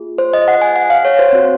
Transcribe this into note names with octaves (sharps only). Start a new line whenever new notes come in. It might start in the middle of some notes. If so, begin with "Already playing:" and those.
Already playing: A#3 F4 G#4
C5
D#5
F#5
G#5
F#5
F5
C#5
C5
C4 F#4